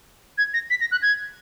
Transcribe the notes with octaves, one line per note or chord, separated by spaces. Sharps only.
G#6
A#6
B6
A#6
F#6
G#6